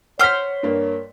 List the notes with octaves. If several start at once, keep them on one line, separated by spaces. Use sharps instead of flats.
C5 C#5 F#5 F6 B6
G2 A#3